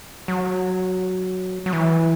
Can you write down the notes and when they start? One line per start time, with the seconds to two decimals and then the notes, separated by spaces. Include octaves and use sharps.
0.28 F#3
1.66 F#3
1.73 E3